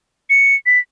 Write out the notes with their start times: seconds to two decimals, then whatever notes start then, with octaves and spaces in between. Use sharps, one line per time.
0.30 C#7
0.66 B6